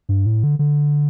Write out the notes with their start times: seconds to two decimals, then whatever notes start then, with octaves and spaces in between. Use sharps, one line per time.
0.09 G2
0.26 A2
0.43 D3
0.59 D3